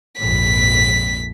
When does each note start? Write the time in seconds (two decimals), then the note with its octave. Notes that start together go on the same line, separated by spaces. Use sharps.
0.19 A#1 F2 G#2 B6